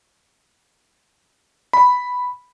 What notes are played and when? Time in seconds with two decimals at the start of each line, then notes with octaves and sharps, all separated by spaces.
1.73 B5